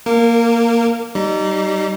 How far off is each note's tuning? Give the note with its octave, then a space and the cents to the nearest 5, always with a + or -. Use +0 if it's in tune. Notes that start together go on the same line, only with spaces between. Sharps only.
A#3 +0 A#4 -30
G3 -30 D#4 -10